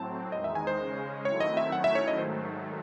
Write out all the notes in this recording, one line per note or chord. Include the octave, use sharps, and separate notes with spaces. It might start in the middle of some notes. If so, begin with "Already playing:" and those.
Already playing: A2 F#3 C4 A5
E2 D#3 G#3 D#4 D#5
E5
G#5
C5
C#3 G#3 C#4
D#3 F#3 A3 C4 E4 C#5
D#5
E5
D#3 F#3 A3 C#4 E4 F#5
E5
C#5
D#5
G#2 D#3 F#3 A3 C5